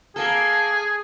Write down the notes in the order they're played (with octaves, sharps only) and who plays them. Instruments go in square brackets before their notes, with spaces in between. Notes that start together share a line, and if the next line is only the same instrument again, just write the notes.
[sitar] A#3 A4 [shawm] G#4